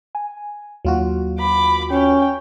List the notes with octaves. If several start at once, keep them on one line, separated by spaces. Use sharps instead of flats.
G#5
D#2 F#3 F4 F#4
B5 D6
C#4 C#5 G5